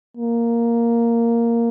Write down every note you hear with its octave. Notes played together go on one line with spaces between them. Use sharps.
A#3